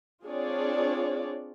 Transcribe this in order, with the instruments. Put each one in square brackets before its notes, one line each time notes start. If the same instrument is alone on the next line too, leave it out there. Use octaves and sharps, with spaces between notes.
[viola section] C4 D4 F4 G#4 C#5 D5